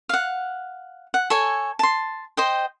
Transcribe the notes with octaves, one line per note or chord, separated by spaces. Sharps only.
F5 F#5
F#5
A4 C#5 G#5
A5 C6
C5 D#5 G5